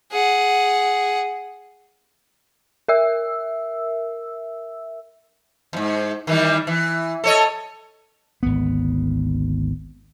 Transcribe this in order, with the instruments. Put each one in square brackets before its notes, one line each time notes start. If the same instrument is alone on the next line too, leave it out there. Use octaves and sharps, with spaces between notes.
[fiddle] G#4 F#5
[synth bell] A#4 E5 E6
[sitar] E2 G#2
D#3 E3 G3
E3
A4 C#5 D#5
[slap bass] G#1 D2 B3